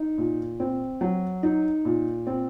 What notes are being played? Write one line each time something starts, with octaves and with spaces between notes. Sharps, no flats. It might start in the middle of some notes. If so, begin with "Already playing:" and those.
Already playing: D#4
A#2
C4
F#3
D#4
A#2
C4